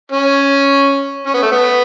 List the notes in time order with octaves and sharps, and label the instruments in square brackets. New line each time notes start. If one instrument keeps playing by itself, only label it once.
[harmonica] C#4
C#4
B3
A3
B3